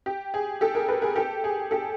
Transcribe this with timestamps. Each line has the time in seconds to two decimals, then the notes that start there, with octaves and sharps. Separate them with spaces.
0.06 G4
0.34 G#4
0.61 G4 A4
0.75 G#4 A#4
0.88 A4 B4
1.02 G#4 A#4
1.16 G4 A4
1.44 G#4
1.71 G4 A4